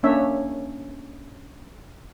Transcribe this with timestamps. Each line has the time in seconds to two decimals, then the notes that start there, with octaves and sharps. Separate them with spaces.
0.03 A#3 C#4 D4 C#5 E5